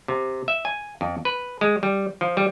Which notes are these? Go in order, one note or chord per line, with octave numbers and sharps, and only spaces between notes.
C3
E5
G#5
F2
B4
G#3
G3
F3
G3